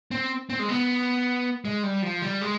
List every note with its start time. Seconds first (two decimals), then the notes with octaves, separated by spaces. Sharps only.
0.11 C4
0.50 C4
0.59 G#3
0.69 B3
1.65 G#3
1.83 G3
2.02 F3
2.22 G3
2.41 G#3